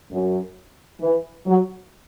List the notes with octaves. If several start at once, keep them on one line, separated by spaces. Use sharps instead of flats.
F#2
E3
F#3